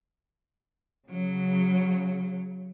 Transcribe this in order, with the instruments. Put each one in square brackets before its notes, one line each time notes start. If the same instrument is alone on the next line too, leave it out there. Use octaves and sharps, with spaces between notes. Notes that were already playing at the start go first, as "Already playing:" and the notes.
[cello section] C#3 F#3